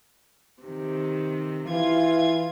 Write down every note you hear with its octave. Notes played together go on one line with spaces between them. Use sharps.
C3 D#3
E3 F4 G#6